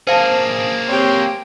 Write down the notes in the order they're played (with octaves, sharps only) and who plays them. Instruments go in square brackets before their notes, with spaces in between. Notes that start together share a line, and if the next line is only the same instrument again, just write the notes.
[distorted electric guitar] A#3 G#4 [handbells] C5 F5 A5
[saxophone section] C4 G4 C#5